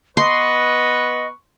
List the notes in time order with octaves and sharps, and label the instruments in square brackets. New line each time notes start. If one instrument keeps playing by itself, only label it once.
[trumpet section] B3 B4 C#6 [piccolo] D#5 [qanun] C6